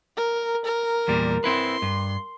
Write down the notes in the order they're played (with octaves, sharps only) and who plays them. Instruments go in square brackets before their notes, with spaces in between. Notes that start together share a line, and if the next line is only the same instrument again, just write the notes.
[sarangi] A#4
A#4
[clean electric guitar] E2 A#2 G3
[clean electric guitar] C4 E4 B4 [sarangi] C6
[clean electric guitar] G2